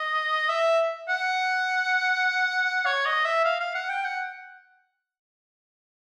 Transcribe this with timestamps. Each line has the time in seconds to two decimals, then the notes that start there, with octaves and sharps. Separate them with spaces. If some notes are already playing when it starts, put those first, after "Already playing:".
Already playing: D#5
0.49 E5
1.09 F#5
2.86 C#5
3.06 D#5
3.25 E5
3.45 F5
3.60 F5
3.75 F#5
3.89 G5
4.04 F#5